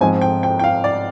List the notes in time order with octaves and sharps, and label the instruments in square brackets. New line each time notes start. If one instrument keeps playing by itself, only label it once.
[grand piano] G#2 F3 C4 D#4 [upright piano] G#5
[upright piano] G5
G5
G5
F5
D5